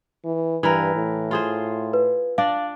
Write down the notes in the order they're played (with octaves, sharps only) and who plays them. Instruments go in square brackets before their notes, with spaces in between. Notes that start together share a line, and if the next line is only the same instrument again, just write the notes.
[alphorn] E3
[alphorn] G2 [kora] E3 A#4
[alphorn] A2
[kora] F4 G#4 C5
[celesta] B4
[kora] D4 D5 [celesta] F5